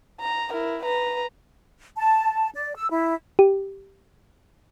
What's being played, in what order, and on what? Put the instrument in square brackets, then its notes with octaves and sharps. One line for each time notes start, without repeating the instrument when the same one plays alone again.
[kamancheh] A#5
E4 A#4
B4 A#5
[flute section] A5
D5
E6
E4
[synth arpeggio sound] G4